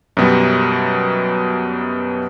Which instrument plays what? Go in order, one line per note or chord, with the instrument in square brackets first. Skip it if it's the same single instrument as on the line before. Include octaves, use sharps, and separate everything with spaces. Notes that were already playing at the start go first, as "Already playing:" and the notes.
[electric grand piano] F#2 B2 G3